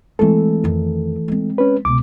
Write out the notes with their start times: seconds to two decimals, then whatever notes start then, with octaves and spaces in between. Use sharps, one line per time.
0.19 E3 G#3 A3 C4 A4
0.64 F2 D#3
1.28 G#3 C4
1.58 C#4 B4
1.85 C#2 B2 D6